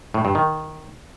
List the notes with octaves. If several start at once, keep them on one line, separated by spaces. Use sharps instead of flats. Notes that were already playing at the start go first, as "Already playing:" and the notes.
A2
G2
D#3